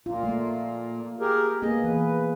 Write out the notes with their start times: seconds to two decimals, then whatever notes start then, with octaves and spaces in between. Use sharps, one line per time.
0.06 A#2 F4
0.23 A3 A#3
1.20 G4 G#4 A#4
1.62 A#3 B3 G#4 D#5
1.84 E3 B4